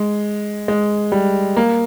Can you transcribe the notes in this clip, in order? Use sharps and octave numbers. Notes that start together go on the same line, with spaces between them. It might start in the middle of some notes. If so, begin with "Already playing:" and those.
Already playing: G#3
G#3
G3
A#3